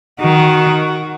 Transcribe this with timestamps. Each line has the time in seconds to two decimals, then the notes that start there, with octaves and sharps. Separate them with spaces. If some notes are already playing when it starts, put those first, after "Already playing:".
0.20 D#3 F#4